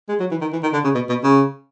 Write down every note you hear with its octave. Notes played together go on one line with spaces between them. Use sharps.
G#3
F#3
E3
D#3
E3
D#3
D3
C#3
B2
B2
C#3